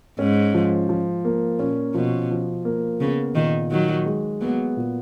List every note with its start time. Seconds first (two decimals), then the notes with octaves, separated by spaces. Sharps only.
0.19 G#2 C#4
0.54 F3
0.89 F3
1.25 A#3
1.59 A#2 C#4
1.94 B2 F3
2.30 F3
2.65 A#3
3.00 C#3 B3
3.35 A#2 D#3
3.71 D#3 F#3 D#4
4.06 G#3
4.41 F#3 A#3 B3
4.77 A#2